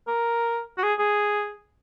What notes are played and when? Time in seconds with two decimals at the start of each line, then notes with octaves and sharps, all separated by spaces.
0.08 A#4
0.78 F#4
0.84 G#4
0.99 G#4